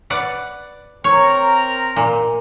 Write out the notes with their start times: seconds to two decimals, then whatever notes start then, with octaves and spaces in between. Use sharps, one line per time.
0.10 B4 D5 F#5
1.04 C4 A#4 C#5 A#5
1.96 A#2